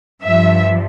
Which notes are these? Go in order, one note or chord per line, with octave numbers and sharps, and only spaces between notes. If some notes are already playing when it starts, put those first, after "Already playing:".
G2 F3 E5